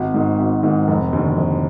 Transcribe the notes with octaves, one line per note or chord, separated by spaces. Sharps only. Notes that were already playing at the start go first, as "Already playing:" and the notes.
Already playing: G#1
G#2 D#3
G#1
G#2 D#3
F1
D#2 D3
F1